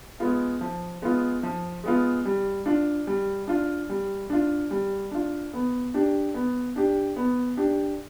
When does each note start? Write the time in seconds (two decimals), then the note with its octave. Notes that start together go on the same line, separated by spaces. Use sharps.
0.20 G#3 B3 F4
0.61 F3
1.02 G#3 B3 F4
1.43 F3
1.84 G#3 B3 F4
2.25 G3
2.66 D4 F4
3.07 G3
3.47 D4 F4
3.89 G3
4.30 D4 F4
4.71 G3
5.11 D4 F4
5.53 B3
5.94 D4 G4
6.34 B3
6.76 D4 G4
7.16 B3
7.57 D4 G4